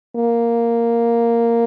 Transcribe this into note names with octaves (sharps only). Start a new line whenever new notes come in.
A#3